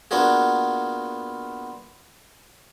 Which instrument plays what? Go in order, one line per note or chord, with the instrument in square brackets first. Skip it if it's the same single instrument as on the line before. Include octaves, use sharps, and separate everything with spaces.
[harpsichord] A#3 B3 D4 F4 F#4 G#4